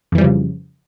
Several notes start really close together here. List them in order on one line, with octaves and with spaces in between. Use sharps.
F2 E3 G3 F3 C#3